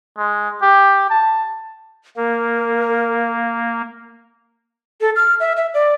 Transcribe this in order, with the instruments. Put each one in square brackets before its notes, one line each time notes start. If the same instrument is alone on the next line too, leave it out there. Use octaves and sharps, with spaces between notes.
[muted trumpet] G#3
G4
A5
[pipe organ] A#3 [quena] A#4
[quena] A4
F6
E5
E5
D5